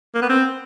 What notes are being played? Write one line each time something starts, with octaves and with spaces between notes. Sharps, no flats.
A#3
B3
C4